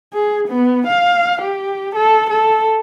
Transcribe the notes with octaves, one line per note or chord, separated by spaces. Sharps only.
G#4
B3
F5
G4
A4
A4